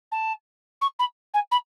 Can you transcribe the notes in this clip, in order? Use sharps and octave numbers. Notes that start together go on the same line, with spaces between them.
A5
C#6
B5
G#5
B5